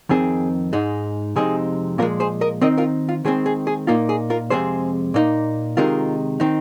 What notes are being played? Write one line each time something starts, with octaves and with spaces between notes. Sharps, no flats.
F2 D#3 C4 G#4
G#2 G#3 D#4
F2 C3 G#3 C4 D#4 G#4
A#2 F3 G#3 F4 A#4
G#4 C5
A#4 D#5
D#3 C4 D#4 A#4 D#5
F4 A#4
F4
D#3 G#3 C4 G#4
G#4
G#4
A#2 A#3 D#4 F4
G#4
F4 A#4
F2 C3 G#3 C4 G#4 C5
A#2 A#3 D#4
C3 D#3 G#3 D#4 F4 A#4
D#3 C4 D#4